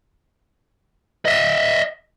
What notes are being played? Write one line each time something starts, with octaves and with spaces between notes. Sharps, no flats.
D#5 E5